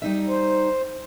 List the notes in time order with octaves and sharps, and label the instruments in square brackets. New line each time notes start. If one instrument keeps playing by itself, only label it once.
[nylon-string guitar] G3 D#4 E5
[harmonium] C5